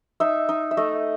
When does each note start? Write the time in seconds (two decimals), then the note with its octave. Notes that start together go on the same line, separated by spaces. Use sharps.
0.20 D#4 E5
0.49 D#4
0.71 E5
0.77 A3 D#5